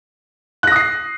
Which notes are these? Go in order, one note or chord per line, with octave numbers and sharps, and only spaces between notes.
D#6 F#6 A#6 C7